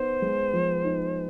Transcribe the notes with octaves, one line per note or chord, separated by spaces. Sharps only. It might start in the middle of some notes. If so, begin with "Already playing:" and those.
Already playing: B3 D#4 C5
G#3
F3
D#4